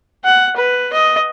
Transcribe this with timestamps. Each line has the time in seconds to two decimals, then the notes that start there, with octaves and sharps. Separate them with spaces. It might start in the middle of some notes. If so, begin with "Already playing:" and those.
0.25 F#5
0.57 B4
0.93 D#5